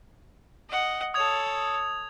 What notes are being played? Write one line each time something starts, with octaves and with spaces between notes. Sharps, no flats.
D#5 F#5
A4 C#5 D#6 G#6 F7